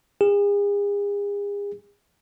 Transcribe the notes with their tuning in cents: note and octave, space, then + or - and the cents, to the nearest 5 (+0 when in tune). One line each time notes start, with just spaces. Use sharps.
G#4 -40